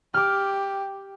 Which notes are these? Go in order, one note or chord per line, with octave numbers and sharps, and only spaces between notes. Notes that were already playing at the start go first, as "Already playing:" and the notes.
G4 D6 F6